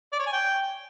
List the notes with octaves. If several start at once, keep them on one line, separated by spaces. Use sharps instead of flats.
D5
C#5
G#5
G5